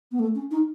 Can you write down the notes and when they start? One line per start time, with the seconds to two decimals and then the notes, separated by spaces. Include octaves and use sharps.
0.12 B3
0.19 A3
0.35 C#4
0.51 D#4